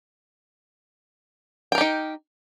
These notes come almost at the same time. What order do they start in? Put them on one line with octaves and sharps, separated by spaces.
G5 A#4 G4 D#4